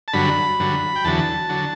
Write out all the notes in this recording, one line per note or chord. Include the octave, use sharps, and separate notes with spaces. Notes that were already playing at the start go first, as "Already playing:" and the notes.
A5
G2 D3 F#3 B5
G2 D3 F#3
G5
E2 D3 F#3 A5
D3 F#3